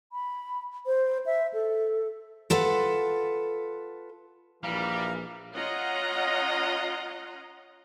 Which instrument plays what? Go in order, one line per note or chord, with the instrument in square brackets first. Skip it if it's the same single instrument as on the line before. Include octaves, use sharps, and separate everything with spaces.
[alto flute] B5
C5
E5
A4
[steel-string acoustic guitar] F4 A4 B4 F#5
[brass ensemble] A#1 E3 [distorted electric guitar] G3 [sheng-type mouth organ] F5 A#5
[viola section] C#4 F4 D#5 F#5 A#5